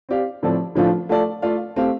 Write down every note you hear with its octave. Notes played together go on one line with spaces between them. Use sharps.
C4 G4 D5 F5
A2 F3 C4 A4 D5
A2 F3 A3 D4 F4
A3 F4 A4 D5
A3 F4 D5 F5
A3 C4 G4 F5